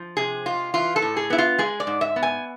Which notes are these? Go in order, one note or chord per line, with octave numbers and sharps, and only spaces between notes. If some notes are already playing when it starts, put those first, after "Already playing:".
Already playing: F3
C3 G#4
G#3 F4
E3 F4
A4
A2
G#4
B3 E4
F4
G#3 G#4
D5
G#2
E5
B3
G#5